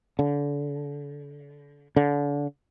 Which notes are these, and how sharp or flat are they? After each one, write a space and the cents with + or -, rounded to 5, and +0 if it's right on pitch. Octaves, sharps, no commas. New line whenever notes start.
D3 -30
D3 -30